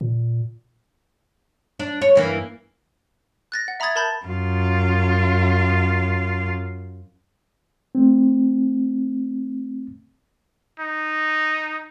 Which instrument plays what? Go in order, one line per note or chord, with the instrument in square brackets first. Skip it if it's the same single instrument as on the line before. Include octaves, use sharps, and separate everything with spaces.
[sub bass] A#2
[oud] D4
C#5
G2 E3 A#3
[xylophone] F#6 A6 A#6
F#5
E5 A#5 B5 D#6 G#6 A6
A#4 A5 B5 G6 A6
[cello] F#2 F4
[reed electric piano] A3 C4
[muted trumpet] D#4